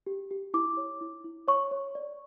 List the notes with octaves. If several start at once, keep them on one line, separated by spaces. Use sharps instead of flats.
G4
G4
E4 D6
C#5
E4
E4
C#5 C#6
C#5
D5